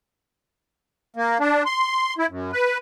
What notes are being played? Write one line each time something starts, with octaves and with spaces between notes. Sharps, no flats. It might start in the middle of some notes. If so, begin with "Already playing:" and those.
A#3
D4
C6
E4
F#2
B4